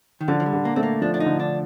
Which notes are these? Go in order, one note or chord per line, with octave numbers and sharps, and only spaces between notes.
D#3
D3 F3
F3
G3
D3
A#3
A3 C4
A#3
F3 D4
D4
D#4
D3
D4